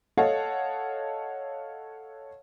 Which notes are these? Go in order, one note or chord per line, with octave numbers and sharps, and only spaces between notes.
A4 C#5 D#5 F5 F#5 A5